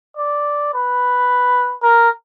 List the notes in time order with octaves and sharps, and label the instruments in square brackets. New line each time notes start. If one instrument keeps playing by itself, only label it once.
[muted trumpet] D5
B4
A#4